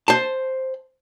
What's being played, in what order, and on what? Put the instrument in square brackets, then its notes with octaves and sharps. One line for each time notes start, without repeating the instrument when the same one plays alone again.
[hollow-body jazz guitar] C5 A5